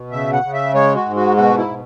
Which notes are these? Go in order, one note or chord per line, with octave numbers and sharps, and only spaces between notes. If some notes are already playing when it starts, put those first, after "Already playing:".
Already playing: B2
C#3 E5
F#5
C#3
E5
G#3 C#5
F#4
G#2
F#4
B2 F#4
E4
B2